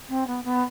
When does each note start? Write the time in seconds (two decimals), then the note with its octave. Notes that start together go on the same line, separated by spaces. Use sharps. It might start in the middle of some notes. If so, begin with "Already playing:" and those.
0.09 C4
0.27 B3
0.44 B3